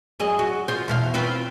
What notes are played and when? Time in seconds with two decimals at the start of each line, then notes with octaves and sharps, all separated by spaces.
0.19 F#2 G#4 D#5
0.39 F#4
0.68 F4 C5
0.88 E2 B2 F5
1.14 C4 F4 B4